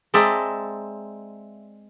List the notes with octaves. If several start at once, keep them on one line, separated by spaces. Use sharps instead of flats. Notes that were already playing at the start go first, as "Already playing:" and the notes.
G#3 C4 D5 E5 A5 A#5